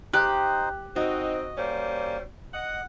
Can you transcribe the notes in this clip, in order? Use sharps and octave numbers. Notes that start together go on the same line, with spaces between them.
D#4 G4 C5 D#5 F#6
C4 D#4 F#4 D#5
G3 A#3 C#4 C5
D#5 F#5 D#6